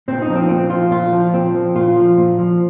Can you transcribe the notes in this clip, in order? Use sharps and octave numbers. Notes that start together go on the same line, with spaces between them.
A#2 C4
D#4
F3
C4
A#2 C4
F3 F4
A#2 F4
F3
A#2 C4
F3
A#2 F4
F3
A#2
F3